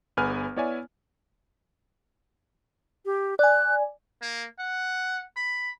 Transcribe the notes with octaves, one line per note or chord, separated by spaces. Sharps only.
G1 B3 G#4 B4 G#5 F6
B3 E4 C#5 D5 E5 G#5
G4
D5 G#5 F#6
A#3
F#5
B5